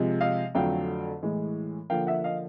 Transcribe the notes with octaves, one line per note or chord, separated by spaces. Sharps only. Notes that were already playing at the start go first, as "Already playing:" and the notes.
Already playing: C3 F3 G#3
D#5 F5
F2 D3 F#3 A3 F5 G5
A2 E3 G#3
D3 F3 A#3 F5 G5
E5 F#5
D#5 F5